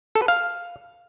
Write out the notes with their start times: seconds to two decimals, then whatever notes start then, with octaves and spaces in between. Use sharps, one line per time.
0.15 A4
0.22 B4
0.28 F5